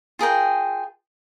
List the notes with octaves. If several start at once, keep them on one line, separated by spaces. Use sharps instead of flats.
F4 G#4 A#4 G5